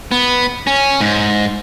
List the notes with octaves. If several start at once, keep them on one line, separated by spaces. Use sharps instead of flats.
B3
C#4
G#2